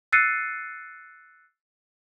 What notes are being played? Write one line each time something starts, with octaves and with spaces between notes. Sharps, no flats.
E6 F#6 A6 C7 C#7 D#7